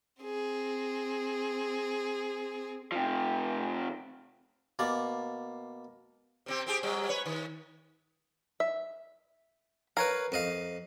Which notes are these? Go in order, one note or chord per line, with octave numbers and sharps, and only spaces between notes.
C4 G#4
C3 F3
B2 A#3 D5
C3 C4 G4
C4 G4 G#4
F#3 G3
B4 C#5
D#3
E5
A#4 B4 C#5 F5
F2 D#5 F5